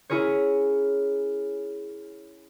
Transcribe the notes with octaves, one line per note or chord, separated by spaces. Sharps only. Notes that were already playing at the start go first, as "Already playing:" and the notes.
C#4 E4 G#4 A#4 C#5